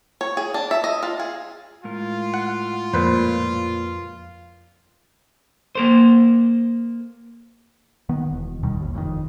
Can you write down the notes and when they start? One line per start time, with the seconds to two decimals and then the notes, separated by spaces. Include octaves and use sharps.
0.21 C#5
0.37 G#4
0.54 D4
0.71 E5
0.84 D#5
1.03 F4
1.19 G#4
1.84 A2 G#3 F4 A#4
2.34 F#5
2.93 F2 A#2 B4 C5
5.75 A#3 A#4 C5
8.09 D#3 B3
8.31 E1
8.63 D2 B2 D#3 G3
8.80 A1 D#2
8.94 F#1 F2 D#3